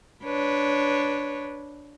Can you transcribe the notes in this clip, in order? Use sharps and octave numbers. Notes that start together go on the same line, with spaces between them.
D4 B4 C#5